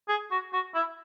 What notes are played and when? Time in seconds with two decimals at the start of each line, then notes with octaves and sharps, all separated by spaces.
0.08 G#4
0.31 F#4
0.53 F#4
0.75 E4